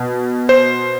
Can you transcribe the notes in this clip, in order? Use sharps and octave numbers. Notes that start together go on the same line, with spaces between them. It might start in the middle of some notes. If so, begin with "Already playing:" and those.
Already playing: B2
C5